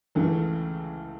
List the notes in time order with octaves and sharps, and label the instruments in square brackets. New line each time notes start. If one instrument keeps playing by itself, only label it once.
[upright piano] C#2 C#3 E3 A3